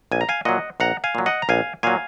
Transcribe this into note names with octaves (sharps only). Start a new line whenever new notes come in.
A#1 G#5
A#5
F5 G#5
A#2 F#3 D#5 F#5
A#1 F#5 A#5
F5 G#5
A#2 F#3
D#5 F#5
A#5
A#1 F5 G#5
A#2 F#3 F5 G#5